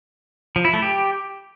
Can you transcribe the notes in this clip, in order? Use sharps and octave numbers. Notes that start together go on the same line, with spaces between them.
F3
E4
A3
G4